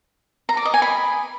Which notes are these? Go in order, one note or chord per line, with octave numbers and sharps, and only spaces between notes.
A#5
D5
D#5
G#5
B5